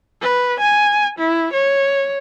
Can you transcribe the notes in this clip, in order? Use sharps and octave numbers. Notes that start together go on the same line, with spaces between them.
B4
G#5
E4
C#5